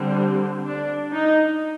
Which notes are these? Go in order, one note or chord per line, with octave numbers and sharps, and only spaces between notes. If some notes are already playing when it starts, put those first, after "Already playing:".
Already playing: D3 G3 C4
D4
D#4